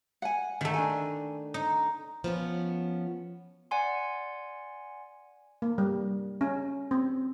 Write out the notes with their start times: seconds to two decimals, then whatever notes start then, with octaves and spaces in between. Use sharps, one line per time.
0.22 F#5 G#5
0.61 D#3 A3 E5
0.74 D4 G#5
1.54 D#4
2.24 F3 B3 C#4
3.71 D5 F#5 G#5 C6
5.62 A#3
5.78 G3
6.41 C#4
6.91 C4